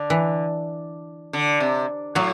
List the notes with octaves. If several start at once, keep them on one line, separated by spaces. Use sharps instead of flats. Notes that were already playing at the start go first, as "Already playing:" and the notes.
Already playing: D3
E3
D3
C3
A2 F#3